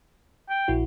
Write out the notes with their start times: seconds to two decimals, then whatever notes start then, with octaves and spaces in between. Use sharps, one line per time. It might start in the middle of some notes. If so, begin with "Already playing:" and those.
0.49 G5
0.68 A#1 E4 F#4